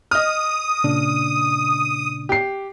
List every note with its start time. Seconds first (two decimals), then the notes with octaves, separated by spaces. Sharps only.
0.11 D#5 D#6 F6
0.84 A#2 C#3 D4
2.29 G4 C7